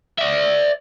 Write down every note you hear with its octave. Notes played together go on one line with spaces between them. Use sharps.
D5 E5